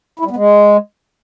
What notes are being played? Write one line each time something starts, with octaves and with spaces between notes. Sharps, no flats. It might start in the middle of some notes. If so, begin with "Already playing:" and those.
E4
G3
B3
G#3